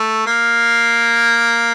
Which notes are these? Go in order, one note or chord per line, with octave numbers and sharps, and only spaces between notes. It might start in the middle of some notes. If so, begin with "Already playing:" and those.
Already playing: A3
A#3